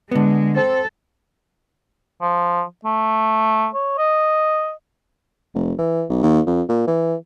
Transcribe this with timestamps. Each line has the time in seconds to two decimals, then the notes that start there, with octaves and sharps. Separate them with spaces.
0.11 D3 G#3 B3
0.56 C4 A4
2.22 F3
2.85 A3
3.74 C#5
3.98 D#5
5.55 F1
5.78 E3
6.10 B1
6.23 D#2
6.47 F2
6.69 A#2
6.87 E3